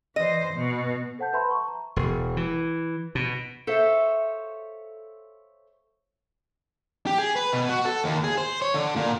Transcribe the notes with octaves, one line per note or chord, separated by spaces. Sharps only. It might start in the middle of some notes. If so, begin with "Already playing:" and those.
E3 C5 D#5
B2
A4 C5 F#5 A5 G6
B4 E5 A5 B5 C6
C#6
A#5
E1
E3
B2
A4 C5 C#5 E5 F5
G4
G#4
B4
B2
F#4
A4
D#2
G#4
C5
C#5
D3
A#2